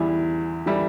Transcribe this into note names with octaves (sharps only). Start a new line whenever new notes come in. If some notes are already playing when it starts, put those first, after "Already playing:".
Already playing: E2 E3 G3 E4
E3 G3 E4